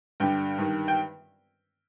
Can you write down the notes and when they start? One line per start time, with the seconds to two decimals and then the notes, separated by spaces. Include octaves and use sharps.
0.20 G2 D3 G5
0.58 G2 D#3
0.88 G5